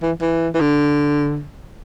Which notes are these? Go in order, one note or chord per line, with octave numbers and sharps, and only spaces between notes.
E3
E3
E3
D3